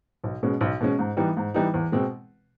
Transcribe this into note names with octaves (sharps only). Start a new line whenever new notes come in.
B1
B2 G#3 C#4
B1
B2 G#3 C#4
G#2
E3 G3 B3 D#4
G#2
E3 G3 B3 D#4
E2
B2 G#3 C4